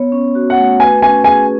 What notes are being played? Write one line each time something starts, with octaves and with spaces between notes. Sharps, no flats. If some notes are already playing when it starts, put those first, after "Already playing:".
Already playing: B3 C#5
C#4
F#4
F#5
A3
B4 G#5
C#4 G#5
G#4 G#5